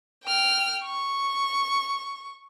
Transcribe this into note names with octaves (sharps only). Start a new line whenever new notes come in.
G5 F6
C#6